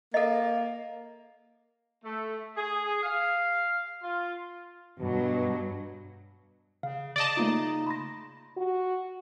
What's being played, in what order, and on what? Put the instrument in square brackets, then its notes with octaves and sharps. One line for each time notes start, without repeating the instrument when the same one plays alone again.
[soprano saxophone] A#3 [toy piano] A4 D#5
[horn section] A3
G#4
F5
F4
[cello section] G2 F#3 [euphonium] B2
[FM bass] C#3 [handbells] F5
[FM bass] C#3 [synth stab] D5 D#5 A5
[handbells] A3 A#3 F4 [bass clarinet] D#4
[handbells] B5 C6 A#6
[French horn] F#4